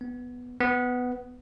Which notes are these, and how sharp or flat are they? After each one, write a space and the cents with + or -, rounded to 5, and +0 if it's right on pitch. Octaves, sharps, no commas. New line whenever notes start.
B3 +0
B3 +10